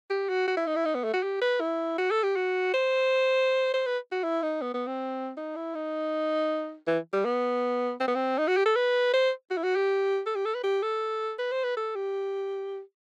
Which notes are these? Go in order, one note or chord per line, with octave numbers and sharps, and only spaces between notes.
G4
F#4
F#4
E4
D#4
E4
D#4
B3
A3
F#4
G4
B4
E4
F#4
A4
G4
F#4
C5
C5
B4
F#4
E4
D#4
B3
B3
C4
D#4
E4
D#4
E3
G3
B3
C4
B3
C4
D#4
F#4
G4
A4
B4
C5
F#4
E4
F#4
G4
A4
G4
A4
B4
G4
A4
B4
C5
B4
A4
G4